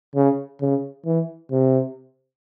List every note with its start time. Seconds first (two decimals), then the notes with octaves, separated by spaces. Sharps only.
0.15 C#3
0.62 C#3
1.06 E3
1.52 C3